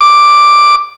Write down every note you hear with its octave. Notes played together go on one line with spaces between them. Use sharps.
D6